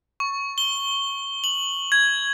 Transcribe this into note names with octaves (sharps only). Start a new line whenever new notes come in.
C#6
G7
F#7
G#6